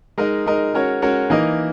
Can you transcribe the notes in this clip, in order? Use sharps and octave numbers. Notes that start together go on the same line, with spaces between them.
G#3 D#4 A#4 D#5
G#3 D#4 A#4 D#5
G#3 C#4 F#4 A#4 C#5
G#3 C#4 F#4 A#4 C#5
E3 A#3 D#4 A#4 D#5